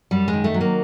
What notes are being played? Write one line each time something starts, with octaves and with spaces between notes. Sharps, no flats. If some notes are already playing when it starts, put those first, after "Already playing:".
F#2 G3
G#3
D#3
A3
F#3
A#3